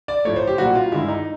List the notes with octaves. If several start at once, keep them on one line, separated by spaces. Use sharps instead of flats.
D5
A2 F3 A3 C#5
C5
G4
A#2 G3 A#3 F#4
F4
G2 D#3 G#3 E4
D#4